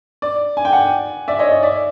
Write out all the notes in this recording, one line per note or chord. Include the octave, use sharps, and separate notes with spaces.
D5
G#5
G5
F#5 G#5
D5 E5
C#5 D#5
D5
D5 E5